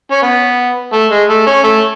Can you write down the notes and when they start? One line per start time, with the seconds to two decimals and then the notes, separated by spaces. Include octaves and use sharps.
0.11 C#4
0.22 B3
0.93 A3
1.11 G#3
1.29 A3
1.47 C#4
1.64 A3